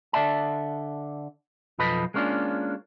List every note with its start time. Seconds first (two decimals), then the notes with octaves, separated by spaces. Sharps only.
0.13 D3 D5 E5 A5
1.79 B1 F2 F3 A4 B4 D#5
2.14 G#3 A#3 C#4 D4 F4